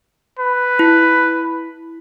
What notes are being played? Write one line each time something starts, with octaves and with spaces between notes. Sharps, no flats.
B4
E4